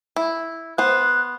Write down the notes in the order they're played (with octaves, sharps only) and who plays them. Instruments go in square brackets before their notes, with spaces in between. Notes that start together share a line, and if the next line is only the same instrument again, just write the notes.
[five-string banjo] E4
[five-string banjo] B3 C5 [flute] F#6